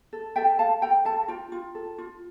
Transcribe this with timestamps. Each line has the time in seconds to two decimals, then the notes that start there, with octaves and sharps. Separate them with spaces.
0.13 A4
0.36 A4 E5 G5
0.59 A4 F5 A5
0.82 A4 G5 A#5
1.05 A4 F5 A5
1.28 F4 G5 A#5
1.52 F4
1.75 A4
1.98 F4